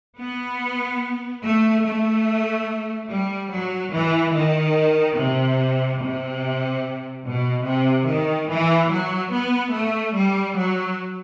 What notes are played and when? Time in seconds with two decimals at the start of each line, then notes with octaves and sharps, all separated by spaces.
0.20 B3
1.44 A3
1.85 A3
3.10 G3
3.51 F#3
3.93 E3
4.34 D#3
5.17 C3
6.01 C3
7.25 B2
7.66 C3
8.08 D#3
8.50 E3
8.91 F#3
9.32 B3
9.73 A3
10.16 G3
10.57 F#3